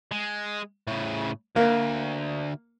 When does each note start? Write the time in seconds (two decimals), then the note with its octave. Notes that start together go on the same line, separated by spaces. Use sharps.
0.12 G#3
0.87 A2 C#3
1.56 D2 A#3